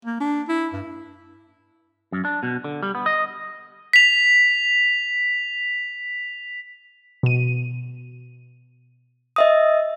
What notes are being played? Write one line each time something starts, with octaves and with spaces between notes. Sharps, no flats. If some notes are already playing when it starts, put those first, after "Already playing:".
A#3
D4
E4
G2
F#2
D4
B2
D3
G3
B3
D#5
B6 F7
B2 D#7
D#5 E5 D#6